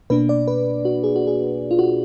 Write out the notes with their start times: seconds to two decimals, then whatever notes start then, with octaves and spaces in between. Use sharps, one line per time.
0.10 B2 A#3 D4 B4
0.29 D5
0.48 B4
0.85 F#4
1.04 G#4
1.16 F#4
1.27 G#4
1.71 F4
1.79 F#4